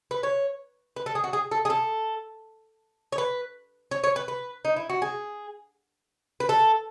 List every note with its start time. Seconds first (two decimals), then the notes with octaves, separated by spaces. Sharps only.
0.11 B4
0.23 C#5
0.96 B4
1.06 A4
1.15 G#4
1.24 F#4
1.33 G#4
1.51 A4
1.65 G#4
1.70 A4
3.12 C#5
3.18 B4
3.91 C#5
4.04 C#5
4.16 B4
4.28 B4
4.65 D#4
4.76 E4
4.90 F#4
5.02 G#4
6.40 B4
6.49 A4